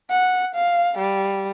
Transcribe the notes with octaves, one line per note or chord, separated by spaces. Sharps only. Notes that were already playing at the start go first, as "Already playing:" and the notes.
F#5
F5
G3